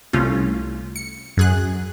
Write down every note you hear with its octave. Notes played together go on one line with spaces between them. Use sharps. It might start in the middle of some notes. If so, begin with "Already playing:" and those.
C2 A3 C#4 F4
C#7
F#2 G#4 F#6